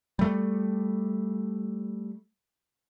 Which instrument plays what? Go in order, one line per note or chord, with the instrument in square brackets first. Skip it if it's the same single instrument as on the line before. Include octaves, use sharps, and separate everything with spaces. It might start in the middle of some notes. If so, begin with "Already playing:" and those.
[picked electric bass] G3 A3